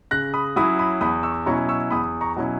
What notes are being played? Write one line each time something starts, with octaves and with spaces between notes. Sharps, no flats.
C#3 F#6 A#6
B5 D#6
F#3 C#4 E4 B5 D#6
B5 D#6
E2 B5 D#6
C#6 E6
B2 F#3 C#4 E4 A#5 C#6
C#6 E6
E2 B5 D#6
A#5 C#6
B2 F#3 C#4 E4